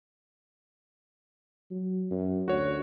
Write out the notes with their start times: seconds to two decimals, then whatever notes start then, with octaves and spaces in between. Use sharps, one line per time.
1.71 F#3
2.11 F#2
2.48 D2 F#4 C#5